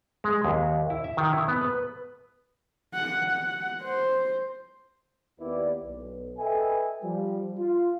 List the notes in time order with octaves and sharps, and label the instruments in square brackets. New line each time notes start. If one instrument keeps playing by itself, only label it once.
[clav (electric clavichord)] G#3
D#2
E4
E5
D#3
E4
B3
B4
[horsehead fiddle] F#5
F#5
C5
[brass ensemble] D#2 B3 E4 G4 B4 D5
B1
A4 B4 D#5 E5 G5 G#5
F3 G3
F4